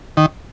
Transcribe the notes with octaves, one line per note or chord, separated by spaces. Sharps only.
D#3